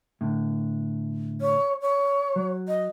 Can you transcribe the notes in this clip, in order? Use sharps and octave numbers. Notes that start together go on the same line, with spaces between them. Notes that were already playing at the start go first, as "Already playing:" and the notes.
A2 D3
C#5
C#5
F#3
D#5